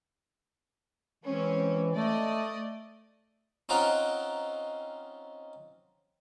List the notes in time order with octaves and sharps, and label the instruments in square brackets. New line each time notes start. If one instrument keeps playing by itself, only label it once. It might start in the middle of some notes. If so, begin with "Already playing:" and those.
[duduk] E3 [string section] G#3 C4 C#4
[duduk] A3 [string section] D5 D#5
[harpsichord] C4 C#4 D#4 F4 F#5 A#5